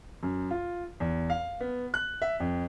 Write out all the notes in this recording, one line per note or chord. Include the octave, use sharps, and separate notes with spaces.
F#2
F4
E2
F5
B3
F#6
E5
F2